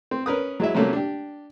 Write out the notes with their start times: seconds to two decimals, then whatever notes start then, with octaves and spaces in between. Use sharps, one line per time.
0.11 C4
0.26 C#4 A#4 B4 D#6
0.60 F#3 G#3 E4 E5
0.75 C3 F#3 G3 A3 A#3 C#4
0.93 D4 G4